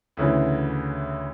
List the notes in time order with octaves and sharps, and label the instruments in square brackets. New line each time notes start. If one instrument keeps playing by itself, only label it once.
[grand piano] D2 C#3 E3